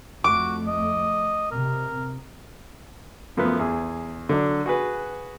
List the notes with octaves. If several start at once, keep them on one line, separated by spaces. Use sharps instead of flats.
F2 A3 F#4 D6
D#5
C3 A#4
F#2 F3 A3 B3
E2 G#4
D3 F#3 D4
F#4 G#4 B4